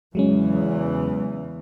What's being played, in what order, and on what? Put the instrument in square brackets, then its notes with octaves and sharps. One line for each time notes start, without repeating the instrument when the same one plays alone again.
[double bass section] E2 C#3 E3 [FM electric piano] F#3 G#3 C#4